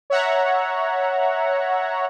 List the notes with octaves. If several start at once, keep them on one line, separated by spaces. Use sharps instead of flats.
C#5 E5 F#5 A#5